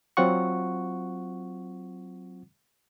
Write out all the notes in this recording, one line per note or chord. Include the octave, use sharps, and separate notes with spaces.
F#3 C4 F4 F#5 C#6